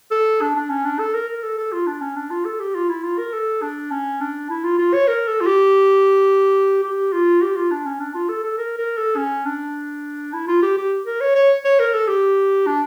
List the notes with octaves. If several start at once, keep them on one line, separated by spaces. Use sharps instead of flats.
A4
D4
D4
C#4
D4
A4
A#4
A#4
A4
A4
F4
D4
C#4
D4
F4
A4
G4
F4
E4
F4
A#4
A4
D4
C#4
D4
E4
F4
F4
C#5
A#4
A4
F4
G4
G4
F4
G4
F4
D4
C#4
D4
F4
A4
A4
A#4
A#4
A4
C#4
D4
E4
F4
G4
G4
A#4
C#5
C#5
C#5
A#4
A4
G4
D4